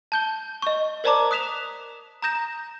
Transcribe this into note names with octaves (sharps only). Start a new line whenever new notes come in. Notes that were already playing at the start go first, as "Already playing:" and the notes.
A5 G6 G7
D#5 C#6
A#4 C5 D5 A5 A#5 D6
D#6 F#6 B6 E7 F7
A#5 D#6 G6 A#6 E7